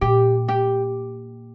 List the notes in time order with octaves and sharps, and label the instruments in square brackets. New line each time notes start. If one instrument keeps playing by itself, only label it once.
[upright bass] A#2 [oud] G4
[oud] G4